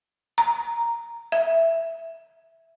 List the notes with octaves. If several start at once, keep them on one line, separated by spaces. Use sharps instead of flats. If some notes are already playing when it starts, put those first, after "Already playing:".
A#5
E5